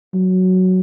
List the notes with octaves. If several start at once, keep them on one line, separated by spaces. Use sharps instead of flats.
F#3